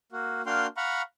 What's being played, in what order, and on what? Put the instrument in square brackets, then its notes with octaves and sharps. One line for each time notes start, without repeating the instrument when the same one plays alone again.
[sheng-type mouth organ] A#3 F#4
A#3 D4 F#4 F5 G5 C6
F5 F#5 A#5 B5 C#6